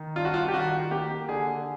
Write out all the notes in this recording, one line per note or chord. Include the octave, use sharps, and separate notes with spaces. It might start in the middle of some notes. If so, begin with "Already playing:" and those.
Already playing: D#3
G2 F4
F#4
F4
G4
D#3 F#4
A#3 G4
D3 G#4